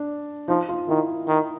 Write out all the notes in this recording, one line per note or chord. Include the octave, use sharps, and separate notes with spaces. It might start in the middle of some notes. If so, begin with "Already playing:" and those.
Already playing: D4
F3 D#4
F4
D#3 E4
D#3